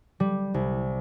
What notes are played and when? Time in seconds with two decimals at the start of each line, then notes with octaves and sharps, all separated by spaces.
0.20 G3
0.54 C2